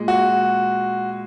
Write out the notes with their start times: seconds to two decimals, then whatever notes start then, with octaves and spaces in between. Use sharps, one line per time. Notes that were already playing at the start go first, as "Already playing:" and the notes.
Already playing: A#2 G#3
0.08 F#4